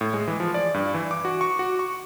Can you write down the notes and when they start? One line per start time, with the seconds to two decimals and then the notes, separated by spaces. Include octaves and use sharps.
0.01 A2
0.14 G#3
0.27 E3
0.40 F3
0.54 D5
0.74 G2
0.94 E3
1.11 D6
1.25 F#4
1.41 C#6
1.59 F#4
1.79 C#6